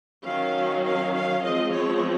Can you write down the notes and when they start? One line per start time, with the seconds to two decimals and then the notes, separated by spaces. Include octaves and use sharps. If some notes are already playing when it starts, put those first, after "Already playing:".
0.24 D#3 F#3 C#4 F5
0.84 F5
1.14 F5
1.44 F3 G#3 C4 D#5
1.73 C#5